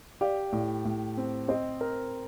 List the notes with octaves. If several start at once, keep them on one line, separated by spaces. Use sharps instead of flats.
G4 D5 F5
A2
A2
C4
C4 C5 D#5
A#4